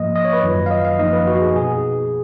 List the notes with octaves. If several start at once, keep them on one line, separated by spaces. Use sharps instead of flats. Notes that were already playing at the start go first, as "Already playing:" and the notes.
Already playing: G#2 F3 A#3 D#5
D#5
C#5
B4
F#2 D#3 F#3 C#4 F4
F5
D#5
F5
F#2 F3 A#3 D#4 D#5
B4
F#4
G#4
B2 G#4